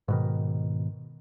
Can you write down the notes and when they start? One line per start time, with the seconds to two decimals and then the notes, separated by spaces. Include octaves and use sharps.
0.08 G#2 B2 D#3